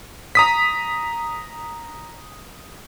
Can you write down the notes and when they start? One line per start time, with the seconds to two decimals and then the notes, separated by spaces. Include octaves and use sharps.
0.35 A#5 D#6 B6